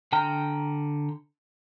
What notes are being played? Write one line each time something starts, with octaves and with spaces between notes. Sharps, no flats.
D3 G5 A#5 F6